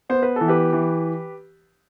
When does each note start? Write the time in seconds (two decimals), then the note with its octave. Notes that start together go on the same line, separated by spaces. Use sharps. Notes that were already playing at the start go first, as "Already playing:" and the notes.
0.09 B3 C5
0.23 B4
0.36 E3 A4
0.48 G4 B4
0.73 E3